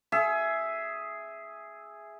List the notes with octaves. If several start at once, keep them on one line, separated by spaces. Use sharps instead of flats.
G#4 E5